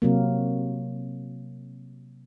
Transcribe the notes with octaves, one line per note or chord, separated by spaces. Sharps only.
C3 F#3 A#3